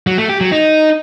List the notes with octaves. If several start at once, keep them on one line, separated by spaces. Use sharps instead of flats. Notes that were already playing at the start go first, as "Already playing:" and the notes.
F#3
A3
G4
F#3
D#4